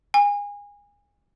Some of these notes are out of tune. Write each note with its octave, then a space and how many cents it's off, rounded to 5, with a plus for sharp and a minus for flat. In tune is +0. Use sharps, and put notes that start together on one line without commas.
G#5 -30